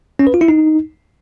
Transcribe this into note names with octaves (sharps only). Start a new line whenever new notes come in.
C#4
B4
F4
E4
D#4